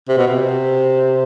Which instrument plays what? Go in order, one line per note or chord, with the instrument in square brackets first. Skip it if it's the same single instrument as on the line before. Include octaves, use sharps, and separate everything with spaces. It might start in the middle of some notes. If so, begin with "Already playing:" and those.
[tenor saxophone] C3
B2
C3